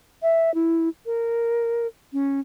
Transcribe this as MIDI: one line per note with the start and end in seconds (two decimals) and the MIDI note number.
0.22 0.53 76
0.54 0.89 64
1.06 1.87 70
2.13 2.40 61